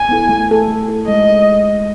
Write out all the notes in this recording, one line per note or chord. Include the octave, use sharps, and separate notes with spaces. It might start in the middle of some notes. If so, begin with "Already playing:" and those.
Already playing: G#5
B3 E4 A4
A3
E4 A4
A3
E4 A4
G#3 D#5